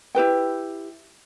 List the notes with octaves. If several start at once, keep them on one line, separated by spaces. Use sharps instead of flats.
E4 G4 B4 G5